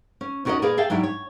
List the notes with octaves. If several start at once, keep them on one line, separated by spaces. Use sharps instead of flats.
C#4
D#2 C#4 F#4 A#4 C#5 D#5
A#2 A#3 G#4 B4 D5 F5
G#4 E5 F5 G5 A5
G#2 F#3 D4 E4 G4
C#5